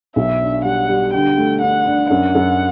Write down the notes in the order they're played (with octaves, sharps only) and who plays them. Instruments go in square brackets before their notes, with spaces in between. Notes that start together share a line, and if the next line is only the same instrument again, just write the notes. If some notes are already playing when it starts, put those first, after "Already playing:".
[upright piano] B1 [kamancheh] E5
[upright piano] D4
[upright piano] G3 [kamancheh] F#5
[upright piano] G3
[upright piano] D3 [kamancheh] G5
[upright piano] A3
[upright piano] D4 [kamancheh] F#5
[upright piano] D4
[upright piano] F#2 [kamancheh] F#5
[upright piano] F#2